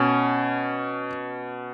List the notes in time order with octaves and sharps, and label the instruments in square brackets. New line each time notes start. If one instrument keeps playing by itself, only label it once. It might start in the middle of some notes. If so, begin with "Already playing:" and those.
Already playing: [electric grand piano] B2 C#4